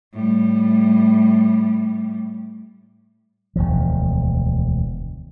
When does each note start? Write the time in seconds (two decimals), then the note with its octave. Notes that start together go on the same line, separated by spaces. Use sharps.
0.14 A2 G3
3.56 E1 D2 F3